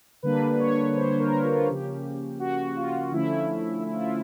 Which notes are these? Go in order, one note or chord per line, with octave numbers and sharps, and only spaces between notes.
D3 G3 A#3 D4 B4
C#5
C5
A#4
F4
C#3 F3 A#3 C#4 G4
F#4
F4
D3 F3 A3 C#4 E4
E4
F4
E4